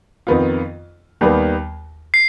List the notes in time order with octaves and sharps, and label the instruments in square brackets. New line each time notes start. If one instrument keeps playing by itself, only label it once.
[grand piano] F2 D#3 B3 F4
D#2 D#3 G3 B3
[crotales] C7